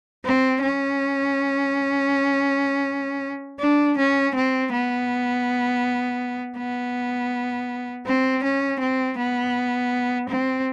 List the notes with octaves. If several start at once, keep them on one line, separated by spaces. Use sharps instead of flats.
C4
C#4
D4
C#4
C4
B3
B3
C4
C#4
C4
B3
C4